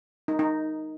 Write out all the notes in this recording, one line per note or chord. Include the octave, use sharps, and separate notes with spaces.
D#4
D#4